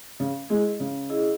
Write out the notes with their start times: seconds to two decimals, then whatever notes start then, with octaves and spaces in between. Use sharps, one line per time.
0.20 C#3
0.50 G#3 E4 G#4 D#5
0.80 C#3
1.10 E4 G#4 D#5